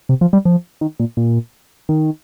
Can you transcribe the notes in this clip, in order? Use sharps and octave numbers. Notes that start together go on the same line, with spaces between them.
C3
F3
G3
F3
D#3
A#2
A#2
D#3